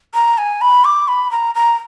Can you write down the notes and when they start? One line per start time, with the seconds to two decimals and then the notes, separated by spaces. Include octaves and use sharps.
0.14 A#5
0.38 G#5
0.61 B5
0.85 D6
1.08 B5
1.31 A#5
1.55 A#5